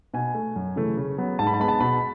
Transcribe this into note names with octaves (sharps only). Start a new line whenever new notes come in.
B2 G#5
A3
F#2
C#3 E3 A3
C#3
F#3 B3
G#2 A5
B5
A5
G#3 B3 B5
A5
B2 B5